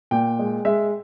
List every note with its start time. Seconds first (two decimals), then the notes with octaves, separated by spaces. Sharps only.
0.11 A#2 G5
0.39 G#3
0.65 G#3 E5